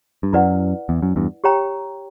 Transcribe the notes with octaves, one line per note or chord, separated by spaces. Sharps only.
G2
F#2 E4 B4 D5 F#5
E2
F#2
E2 G2
G4 C#5 G5 A#5